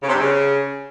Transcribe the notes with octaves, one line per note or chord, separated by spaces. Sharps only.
C#3
C3
G2
C#3